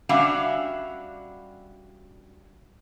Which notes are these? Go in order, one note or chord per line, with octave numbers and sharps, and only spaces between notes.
G3 C#4 D4 F#4 E5 F5